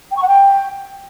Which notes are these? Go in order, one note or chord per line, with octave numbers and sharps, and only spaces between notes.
G5
C#6
F#5
G5